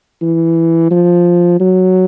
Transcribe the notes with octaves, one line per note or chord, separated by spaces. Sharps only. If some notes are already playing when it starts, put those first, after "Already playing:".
E3
F3
F#3